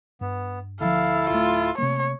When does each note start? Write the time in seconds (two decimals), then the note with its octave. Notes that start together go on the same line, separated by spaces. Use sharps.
0.21 G2 B3
0.81 D2 F3 E4 A4 F5
1.30 D1 A3 F4
1.78 C3 A3 A#3 C#5